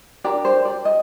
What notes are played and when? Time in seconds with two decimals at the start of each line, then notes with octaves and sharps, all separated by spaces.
0.24 D4 G4 A#4 D5
0.45 C5
0.65 D5
0.85 D#5